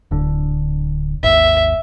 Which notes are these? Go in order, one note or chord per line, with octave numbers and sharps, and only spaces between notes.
D1 D3
G#1 D#2 E5